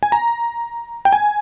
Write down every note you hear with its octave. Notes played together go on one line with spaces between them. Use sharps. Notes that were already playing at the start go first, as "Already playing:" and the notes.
G#5
A#5
G5
G#5